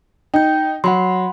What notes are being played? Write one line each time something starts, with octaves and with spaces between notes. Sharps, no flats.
D#4 G5 G6
F#3 F#5 B5 C6